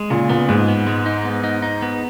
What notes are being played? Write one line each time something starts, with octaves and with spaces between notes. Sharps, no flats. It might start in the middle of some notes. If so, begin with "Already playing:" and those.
Already playing: G#3
A#2 C#3
A#2 B3
G#2 G#3
B3
G#3
D#4
B3
D#4
D#4
B3